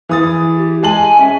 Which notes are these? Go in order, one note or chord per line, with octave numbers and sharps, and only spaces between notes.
E3 G#4 D#6 A6
G4
G#3 G#5 A5 F#7
C#4 E5